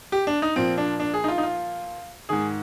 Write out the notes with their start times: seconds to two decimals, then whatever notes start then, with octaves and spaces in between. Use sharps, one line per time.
0.12 G4
0.27 D4
0.42 D#4
0.56 A#2 F3 C4
0.78 D4
1.00 D4
1.14 G#4
1.24 D#4
1.28 F4
1.38 D#4
1.43 F4
2.29 G#2 D#3 G#4